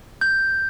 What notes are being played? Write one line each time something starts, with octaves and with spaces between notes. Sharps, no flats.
G6